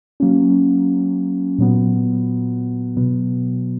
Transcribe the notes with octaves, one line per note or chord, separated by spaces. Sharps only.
F#3 A#3 C#4
A#2 F#3 B3
B2 F#3 B3